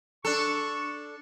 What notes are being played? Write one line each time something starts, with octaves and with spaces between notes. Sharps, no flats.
D4 A4 C#6